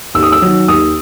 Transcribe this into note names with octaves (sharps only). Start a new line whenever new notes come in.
D#2 E6
D#6
E6
D#3 F#3
D#2 D#6